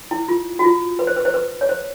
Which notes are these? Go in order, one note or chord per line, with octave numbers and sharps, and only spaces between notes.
E4
F4
F#4
F4
B4
C5
B4
C5
B4
C#5
C5